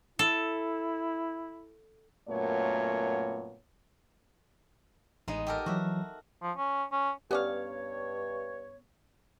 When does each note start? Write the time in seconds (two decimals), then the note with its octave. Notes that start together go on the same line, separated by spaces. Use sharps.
0.19 E4 A4
2.29 F#2 A#2 A3 B3 C#5
5.28 A1 G#3 B3 D#4 D#5
5.47 G4 A4 A#4
5.66 E3 F#3 F#4 E5
6.42 F3
6.57 C#4
6.92 C#4
7.31 G2 B3 C#4 G4 C#5 D5 F5